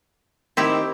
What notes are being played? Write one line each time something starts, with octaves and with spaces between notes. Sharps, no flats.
D#3 C4 E4 G4